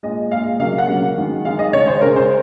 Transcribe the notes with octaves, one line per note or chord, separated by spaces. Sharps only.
A#2 G#3 D#5
A#2 G#3 F5
C#3 F#3 A#3 F5
F#5
C#3 F#3 A#3
D#3 G#3
D#3 G#3 F5
D#5
C#3 G#3 C#5
C5
C#3 G#3 A#4
C5